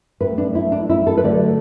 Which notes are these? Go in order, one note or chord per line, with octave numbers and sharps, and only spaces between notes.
A2 A3 B4
D4
E4
D4
E4
A4
B4
D3 F#3 A3 D5